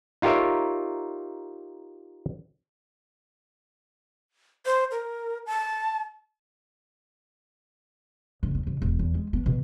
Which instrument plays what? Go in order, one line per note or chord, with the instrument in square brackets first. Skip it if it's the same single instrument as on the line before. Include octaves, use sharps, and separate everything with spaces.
[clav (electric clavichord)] D#4 F4 G4 A#4 C#5 E5
[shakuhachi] C5
A#4
A5
[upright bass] F#1
D#2
F#1
E1
E2
G#3
B3
B2